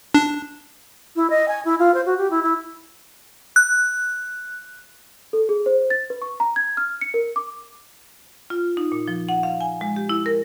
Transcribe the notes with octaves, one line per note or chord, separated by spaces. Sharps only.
D4
E4
D#5
G#5
E4
F4
C5
F#4
G4
E4
E4
F#6
A4
G#4
C5
A6
B4
C#6
A#5
G#6
F6
C#7
A#4
D6
F4
D#4
A#2
F3
F#5
F5
G#5
G#3
G4
E4
A#4